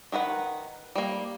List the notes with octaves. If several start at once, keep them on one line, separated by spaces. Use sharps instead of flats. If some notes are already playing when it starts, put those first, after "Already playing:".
D#3 A#4 B4 F#5
G3 A#3